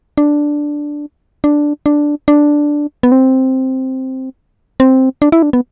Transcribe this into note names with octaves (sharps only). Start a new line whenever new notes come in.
D4
D4
D4
D4
B3
C4
C4
D4
E4
D4
B3